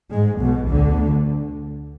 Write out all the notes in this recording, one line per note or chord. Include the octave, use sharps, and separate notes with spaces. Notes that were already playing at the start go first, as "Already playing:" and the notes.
G#2 G#3
B1 B2
D2 D3